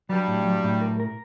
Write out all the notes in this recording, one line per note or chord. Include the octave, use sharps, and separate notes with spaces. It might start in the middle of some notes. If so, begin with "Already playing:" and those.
G2 F#3 G3
A2
F#3
A2
A#4
A#4